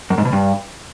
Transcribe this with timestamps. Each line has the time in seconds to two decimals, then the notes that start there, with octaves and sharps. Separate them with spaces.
0.10 F#2
0.18 G#2
0.25 B2
0.33 G2